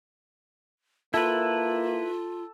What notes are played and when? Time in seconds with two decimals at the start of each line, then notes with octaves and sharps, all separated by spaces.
1.14 A#3 E4 F4 A4 B4 G5